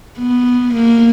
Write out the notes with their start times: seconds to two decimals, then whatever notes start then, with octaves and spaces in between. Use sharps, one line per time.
0.19 B3
0.74 A#3